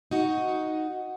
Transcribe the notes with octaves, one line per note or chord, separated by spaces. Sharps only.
D#4 F#4